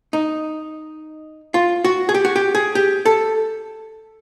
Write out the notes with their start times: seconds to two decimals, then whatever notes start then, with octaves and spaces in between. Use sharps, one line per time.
0.13 D#4
1.54 F4
1.84 F#4
2.09 G#4
2.14 G4
2.25 F#4
2.36 G4
2.55 G#4
2.75 G4
3.06 A4